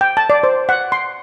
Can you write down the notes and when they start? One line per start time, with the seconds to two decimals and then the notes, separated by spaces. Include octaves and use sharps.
0.01 G5
0.17 A5
0.30 D5
0.43 C5
0.69 F#5
0.92 C6